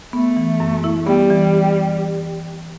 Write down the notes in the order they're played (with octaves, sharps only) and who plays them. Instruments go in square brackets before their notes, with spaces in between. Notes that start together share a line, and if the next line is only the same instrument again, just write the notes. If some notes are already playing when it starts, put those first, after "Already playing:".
[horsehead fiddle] A3 [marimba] B3
[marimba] E3
F#2
E4
[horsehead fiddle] G3 [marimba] B3
[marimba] E3